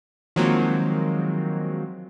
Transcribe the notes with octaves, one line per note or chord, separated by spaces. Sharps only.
D#3 F3 F#3 G#3 A#3 C4